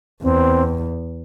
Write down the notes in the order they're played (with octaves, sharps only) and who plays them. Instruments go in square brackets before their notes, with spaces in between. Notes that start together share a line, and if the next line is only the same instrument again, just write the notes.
[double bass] E2 [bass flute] C4